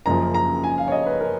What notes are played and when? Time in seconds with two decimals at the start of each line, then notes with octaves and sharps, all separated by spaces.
0.06 F#1 F#2 C#3 F3 A#5
0.34 A#5
0.64 G#5
0.78 F5
0.88 C#5
0.92 D#5
1.06 B4
1.21 A#4